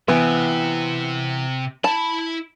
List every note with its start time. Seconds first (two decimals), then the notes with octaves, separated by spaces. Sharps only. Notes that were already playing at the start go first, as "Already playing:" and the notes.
0.08 C3 E3 B3
1.84 E4 A5 B5